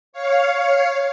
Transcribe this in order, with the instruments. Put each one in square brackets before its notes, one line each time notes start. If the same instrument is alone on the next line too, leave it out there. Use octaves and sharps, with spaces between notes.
[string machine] C#5 F5